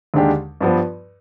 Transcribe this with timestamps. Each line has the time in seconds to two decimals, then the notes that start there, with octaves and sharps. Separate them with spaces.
0.14 D#2 D3 G#3 D4 G4
0.61 G2 F3 B3